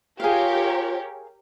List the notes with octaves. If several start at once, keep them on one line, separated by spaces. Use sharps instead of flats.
F4 G4 G#4 A#4 C#5 F5